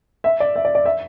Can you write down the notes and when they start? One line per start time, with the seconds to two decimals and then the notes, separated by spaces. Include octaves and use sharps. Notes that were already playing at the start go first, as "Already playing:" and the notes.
0.24 E5
0.40 D5
0.56 E5
0.65 D5
0.75 D5
0.86 E5